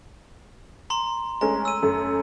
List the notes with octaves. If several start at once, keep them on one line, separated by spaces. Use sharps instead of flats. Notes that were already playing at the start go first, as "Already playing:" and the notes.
A#5 C6
G#3 A3 C#4 A#5
E6 D#7
F#2 A3 A4